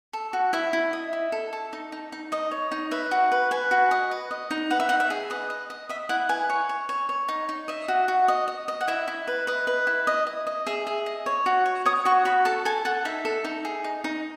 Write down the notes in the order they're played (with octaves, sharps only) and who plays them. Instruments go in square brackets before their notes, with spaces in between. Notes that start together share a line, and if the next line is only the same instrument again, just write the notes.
[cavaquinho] A4
F#4
E4 E5
E4
D#5
E4
A4
A4
D#4
D#4
D#4
D#4 D#5
C#5
D#4
B4 E5
F#4
B4
B4 G#5
F#4
D#5
B4
D#5
D#4
B4 F#5
E5
D#4 F#5
E5
G#4
B4 D#5
D#5
D#5
D#5 E5
E4 F#5
B4 G#5
C#5
C#5
C#5
C#5
D#4
D#4
D#5 E5
F#4
F#4
D#5
D#5
D#5
F#5
E4 E5
E4
B4
B4 D#5
B4
E4
D#5
D#5
D#5
G#4 E5
G#4
D#5
C#5
F#4
C#5
C#5 D#6
F#4 C#6
F#4 B5
A4 A5
A4 G#5
A4 F#5
D#4 E5
A4
D#4
G#4
D#4
D#4